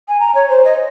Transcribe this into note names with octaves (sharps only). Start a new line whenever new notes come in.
G#5
A#5
C#5
C5
D#5